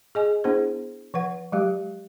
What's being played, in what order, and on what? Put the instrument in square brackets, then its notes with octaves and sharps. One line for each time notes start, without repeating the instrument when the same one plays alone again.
[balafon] G#4 D#5 G#5
B3 D4 E4 G#4 C5
F3 B4 F#5
F#3 G#3 G4